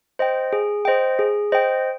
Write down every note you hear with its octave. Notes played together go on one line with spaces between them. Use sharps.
C5 D#5 G5
G#4
C5 D#5 G5
G#4
C5 D#5 G5